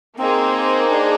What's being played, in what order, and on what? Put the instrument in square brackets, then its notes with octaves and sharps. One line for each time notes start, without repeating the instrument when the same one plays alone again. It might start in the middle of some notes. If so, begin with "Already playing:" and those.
[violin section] A#3 D#4 G#4 C5 [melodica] C4
[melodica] D4